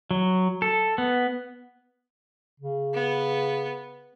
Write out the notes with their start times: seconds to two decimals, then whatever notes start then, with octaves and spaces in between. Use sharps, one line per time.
0.11 F#3
0.62 A4
0.98 B3
2.60 C#3
2.94 B3